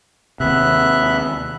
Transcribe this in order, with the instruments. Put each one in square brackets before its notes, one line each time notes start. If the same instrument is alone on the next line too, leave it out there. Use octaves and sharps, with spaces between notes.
[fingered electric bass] D#2 C3 [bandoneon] B3 E5 F#6